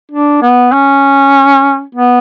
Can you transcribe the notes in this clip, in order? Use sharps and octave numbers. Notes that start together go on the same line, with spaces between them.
D4
B3
C#4
B3